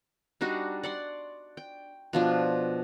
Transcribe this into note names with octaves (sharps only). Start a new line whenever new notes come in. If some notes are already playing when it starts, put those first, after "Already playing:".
G3 D4 D#4 F#4
D5 F#5 C6
G5
B2 F3 D4